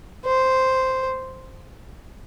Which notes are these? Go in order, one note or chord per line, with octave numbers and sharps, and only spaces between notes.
C5